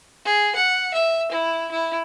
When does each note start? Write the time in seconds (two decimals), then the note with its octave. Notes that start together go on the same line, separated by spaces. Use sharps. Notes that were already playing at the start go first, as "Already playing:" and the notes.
0.25 G#4
0.55 F#5
0.94 E5
1.32 E4
1.71 E4